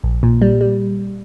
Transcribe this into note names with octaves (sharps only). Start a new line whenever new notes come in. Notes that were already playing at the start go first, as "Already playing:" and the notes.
A#1
A#2
G3
G3